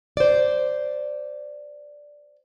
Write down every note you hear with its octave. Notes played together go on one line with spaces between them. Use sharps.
C5 D5